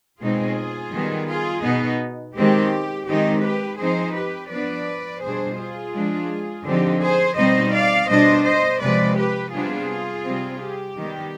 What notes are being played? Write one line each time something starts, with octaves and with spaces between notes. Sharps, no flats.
B2 G#3 C4 D#4 F4 G#4
D#3 G3 B3
F4 G#4
B2 B3 D#4
D#3 G#3 C4 G4
D#3 G#3 C4 D#4 G4
G4 B4
F3 C4 D#4 G#4 C5
G4 B4
F3 B3 D4 B4 D5
B2 G3 D4 G#4 C5
F4 G#4
F3 G#3 D4
D3 F3 C4 D#4 G4
G#4 C5
B2 G3 C4 D#4 C5 D#5
D5 F5
B2 G3 D4 C5 D#5
C5 D#5
C3 F3 G#3 B4 D5
G4 B4
C3 G3 B3 D4 F4 G#4
C3 G3 C4
G4
D#3 G3 B3